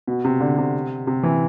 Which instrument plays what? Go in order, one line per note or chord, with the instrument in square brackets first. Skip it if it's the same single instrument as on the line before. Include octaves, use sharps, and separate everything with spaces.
[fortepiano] B2
C3
D3
C3
C3
E3